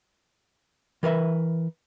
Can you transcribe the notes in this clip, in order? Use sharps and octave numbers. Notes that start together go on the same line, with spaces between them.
E3 A#4 B4 E5